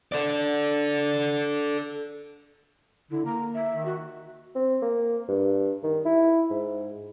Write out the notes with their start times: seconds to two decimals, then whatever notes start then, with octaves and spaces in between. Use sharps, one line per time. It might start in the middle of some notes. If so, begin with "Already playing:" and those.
0.12 A4 D5
3.11 D3 E4
3.25 A#3 A#5
3.54 E5
3.72 D#3
3.85 F#4
4.56 C4
4.82 A#3
5.28 G2
5.84 D#3
6.05 E4
6.51 G#2